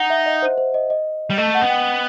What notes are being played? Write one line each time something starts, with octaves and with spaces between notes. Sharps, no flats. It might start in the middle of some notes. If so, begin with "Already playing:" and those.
Already playing: D#4 F#5
E5
D#5
C5
C5
D#5
D#5
G3
A3 D#5
F#5
B3
G5